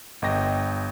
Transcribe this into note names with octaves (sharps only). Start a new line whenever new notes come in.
G1 D#5 G5 A#6